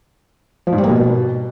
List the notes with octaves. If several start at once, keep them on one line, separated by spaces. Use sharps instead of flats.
F3
G#2
G3
A#3
B2